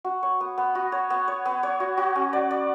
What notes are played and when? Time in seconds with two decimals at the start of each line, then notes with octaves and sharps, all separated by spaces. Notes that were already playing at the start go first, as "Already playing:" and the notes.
0.04 F#4
0.23 C#5
0.40 B3
0.58 B3
0.75 F#4
0.92 C#5
1.10 B3
1.28 C#5
1.45 B3
1.63 C#5
1.80 F#4
1.97 F#4
2.15 C#4
2.33 D5
2.51 D5